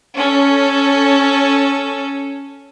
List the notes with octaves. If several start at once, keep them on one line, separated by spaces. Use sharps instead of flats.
C#4 A4